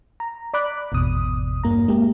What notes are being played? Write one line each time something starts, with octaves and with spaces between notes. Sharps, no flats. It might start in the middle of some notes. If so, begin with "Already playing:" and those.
A#5
D5 B5 D6 F#6
G#1 E2 B2 D#6
G2 A#3 A#5
G#3 A#3 G4